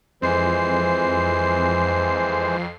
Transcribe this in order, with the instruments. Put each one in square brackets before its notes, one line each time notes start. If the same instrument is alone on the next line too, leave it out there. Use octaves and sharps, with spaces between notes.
[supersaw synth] F2 C7 [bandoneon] E3 G#3 C5